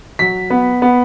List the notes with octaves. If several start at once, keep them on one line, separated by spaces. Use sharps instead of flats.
F#3 B6
B3
B3